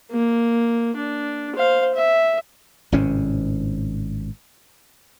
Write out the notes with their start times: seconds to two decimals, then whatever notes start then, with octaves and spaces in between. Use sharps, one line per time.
0.11 A#3
0.96 D4
1.55 C5 F5
1.95 E5
2.92 G#1 A2 C3 C#4